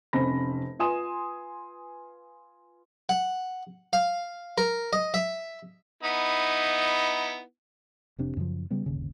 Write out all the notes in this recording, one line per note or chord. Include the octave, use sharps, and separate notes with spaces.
F1 C4 C#4 C5 B5 A#6
F4 B4 G#5 C6 D#6 E7
F#5
F5
A#4
D#5
E5
B3 D#4 E4
F1 C3 D4
F#2 C#3 E3 F3
C#3 G3 B3
D1 G1 D#2 C#3